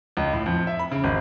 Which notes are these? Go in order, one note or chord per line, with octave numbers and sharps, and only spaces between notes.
C#2
A2
F2
E5
B5
C#3
G#1